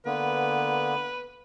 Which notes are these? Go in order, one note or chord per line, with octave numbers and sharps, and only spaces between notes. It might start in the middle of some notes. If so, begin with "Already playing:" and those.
D3 A#3 B3 B4